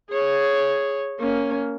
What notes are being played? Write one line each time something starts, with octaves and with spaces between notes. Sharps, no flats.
G#4 C#5
A#3 C#4